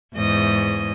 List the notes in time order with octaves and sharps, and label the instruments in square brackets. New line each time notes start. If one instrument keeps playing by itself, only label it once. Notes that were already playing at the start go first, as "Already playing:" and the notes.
[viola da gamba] E2 G#2 D#5